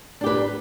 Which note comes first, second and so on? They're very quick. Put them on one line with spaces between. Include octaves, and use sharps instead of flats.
D4 G4 B4